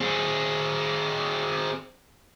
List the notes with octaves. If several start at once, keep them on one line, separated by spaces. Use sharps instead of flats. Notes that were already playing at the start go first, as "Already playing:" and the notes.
C4 G#4